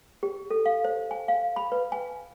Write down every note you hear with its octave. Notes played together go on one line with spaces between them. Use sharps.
G4
A4
F5
C5
G#5
F5
B5
B4
G#5